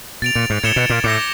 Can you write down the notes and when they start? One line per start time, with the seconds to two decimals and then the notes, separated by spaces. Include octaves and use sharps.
0.22 B2 A6 D7 F7
0.35 A#2
0.50 G#2
0.63 A2 G#6 C#7 E7 G7
0.76 B2
0.90 A#2
1.04 A2 D6 G6 A#6